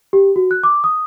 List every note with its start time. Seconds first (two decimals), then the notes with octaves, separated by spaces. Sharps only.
0.13 G4
0.36 F#4
0.51 F#6
0.63 D6
0.84 D#6